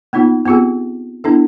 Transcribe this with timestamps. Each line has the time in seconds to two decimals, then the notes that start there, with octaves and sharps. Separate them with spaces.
0.13 A#3 B3 D#4 F4
0.46 B3 C4 F4 G4 G#4
1.24 B3 D4 E4 A4